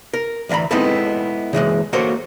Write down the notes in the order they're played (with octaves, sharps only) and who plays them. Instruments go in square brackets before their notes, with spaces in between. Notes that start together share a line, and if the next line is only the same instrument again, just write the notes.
[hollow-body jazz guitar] A#4
D2 E3 E5 A#5 B5
G#3 B3 C4 D#4 E4 A4
C#3 E3 F#3 G#3
A#3 F#4 A4 A#4 C5 C#5